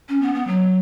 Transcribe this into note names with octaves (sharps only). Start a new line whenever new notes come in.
C#4
B3
B3
F#3